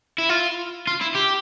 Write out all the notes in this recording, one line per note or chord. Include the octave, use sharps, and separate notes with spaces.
E4
F4
F4
E4
G4